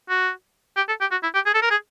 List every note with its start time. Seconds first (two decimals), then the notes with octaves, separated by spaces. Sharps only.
0.10 F#4
0.77 G4
0.89 A4
1.01 G4
1.12 F#4
1.23 E4
1.35 G4
1.46 G#4
1.55 A4
1.62 A#4
1.71 G#4